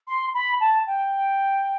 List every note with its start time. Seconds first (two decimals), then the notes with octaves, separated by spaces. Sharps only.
0.07 C6
0.34 B5
0.60 A5
0.87 G5